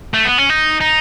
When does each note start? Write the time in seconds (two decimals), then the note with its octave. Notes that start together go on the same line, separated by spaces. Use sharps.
0.14 A3
0.25 B3
0.38 C#4
0.50 D#4
0.81 D#4